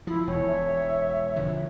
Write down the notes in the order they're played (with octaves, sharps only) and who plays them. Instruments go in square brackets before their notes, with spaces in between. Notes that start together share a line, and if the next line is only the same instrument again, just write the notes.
[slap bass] F3 [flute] E4
[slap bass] E1 [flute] C#5
[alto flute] E5
[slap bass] D3 F3